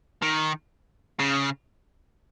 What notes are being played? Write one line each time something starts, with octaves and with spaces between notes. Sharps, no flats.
D#3
C#3